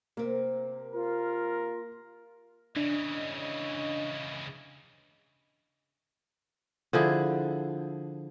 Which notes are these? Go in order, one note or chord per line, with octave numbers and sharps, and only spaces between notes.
C3 A#3 C4
F4 A#4
C#3 E3 D4 D#5
D3 F3 E4 G#4